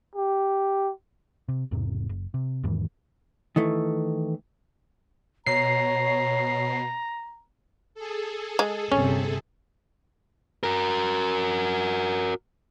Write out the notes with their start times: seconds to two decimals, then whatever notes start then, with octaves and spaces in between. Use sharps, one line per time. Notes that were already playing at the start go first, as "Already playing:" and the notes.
0.16 G4
1.49 C3
1.71 E1 E2 G#2 C3
2.09 F#1
2.34 C3
2.64 E2 G#2 D#3 E3
3.56 D#3 E3 A3
5.46 B2 C#5 A#5 C7
7.95 G#4 A4
8.59 G#3
8.92 G1 C3 C#4
10.63 F#4 A#4